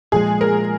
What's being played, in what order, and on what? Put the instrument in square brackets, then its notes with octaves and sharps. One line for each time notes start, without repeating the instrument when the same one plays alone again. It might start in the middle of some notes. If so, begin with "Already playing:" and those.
[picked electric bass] A#2 F3 G#3 [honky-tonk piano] G#4
[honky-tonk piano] A#4